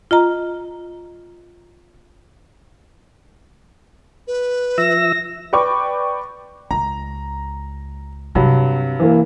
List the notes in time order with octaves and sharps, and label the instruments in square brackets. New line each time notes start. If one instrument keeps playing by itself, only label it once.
[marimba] F4 D#5 A#5
[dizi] B4
[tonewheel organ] F3 E5 E6 [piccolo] A#6
[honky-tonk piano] B4 D5 G5 C#6 D6
[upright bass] C#2 [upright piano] A#5
[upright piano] G2 F#3 [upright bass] C3
[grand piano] E3 A#3